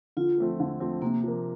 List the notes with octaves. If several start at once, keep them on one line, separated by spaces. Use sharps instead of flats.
D3 F4
F3 A3 C4
D3
F3 A3 C4
C3 A#3
F3 A#3